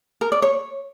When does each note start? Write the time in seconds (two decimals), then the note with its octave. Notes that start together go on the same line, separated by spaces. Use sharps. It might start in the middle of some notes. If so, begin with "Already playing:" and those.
0.21 A#4
0.32 D5
0.42 C#5